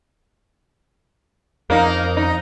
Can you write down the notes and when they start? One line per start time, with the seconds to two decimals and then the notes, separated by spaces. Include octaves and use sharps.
1.70 F2 A#3 D#4
2.17 D#4